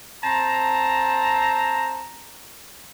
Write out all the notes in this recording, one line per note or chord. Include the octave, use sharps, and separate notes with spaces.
C4 A5 A#5